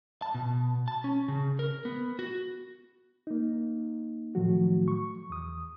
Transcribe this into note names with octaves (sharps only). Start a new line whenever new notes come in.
A5
B2
A5
C#4
C#3
A#4
B3
F#4
A#3 D#4
A2 D#3 F3 F#3 A3 F#4
C#6
E2 D#6